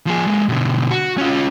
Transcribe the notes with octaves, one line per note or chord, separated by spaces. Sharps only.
F3 G#4
G#3 A#3
B2 D3
F#4
C#4 F4